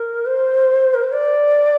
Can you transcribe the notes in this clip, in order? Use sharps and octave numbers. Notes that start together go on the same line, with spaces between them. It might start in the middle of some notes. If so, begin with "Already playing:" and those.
Already playing: A#4
C5
A#4
C5
D5